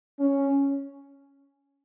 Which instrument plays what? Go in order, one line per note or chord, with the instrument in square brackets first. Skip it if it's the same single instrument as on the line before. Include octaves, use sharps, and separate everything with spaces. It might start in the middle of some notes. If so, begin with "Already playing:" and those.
[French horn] C#4